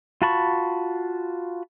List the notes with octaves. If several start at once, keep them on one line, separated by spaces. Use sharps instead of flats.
F4 F#4 A5 B5 C#6